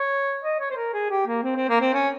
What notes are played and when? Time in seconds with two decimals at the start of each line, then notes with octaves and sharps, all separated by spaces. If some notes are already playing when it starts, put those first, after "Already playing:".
Already playing: C#5
0.43 D#5
0.60 C#5
0.70 C5
0.76 A#4
0.93 G#4
1.10 G4
1.27 A#3
1.43 C4
1.56 C4
1.69 A#3
1.81 C4
1.94 C#4